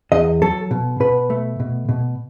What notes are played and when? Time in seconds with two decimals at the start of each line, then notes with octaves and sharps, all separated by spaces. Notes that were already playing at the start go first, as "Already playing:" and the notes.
0.12 E2 D#5
0.42 F#3 A4
0.71 B2
1.00 B2 B4
1.30 A3
1.60 B2
1.89 B2